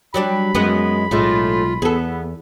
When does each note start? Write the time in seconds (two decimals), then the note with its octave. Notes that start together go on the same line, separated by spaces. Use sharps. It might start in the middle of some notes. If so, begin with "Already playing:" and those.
0.14 F#3 G3 D4 B5
0.55 F#2 G#3 B3 F#4 B4
1.11 B1 A2 G#3 A3 F4
1.82 E2 B3 G#4 A4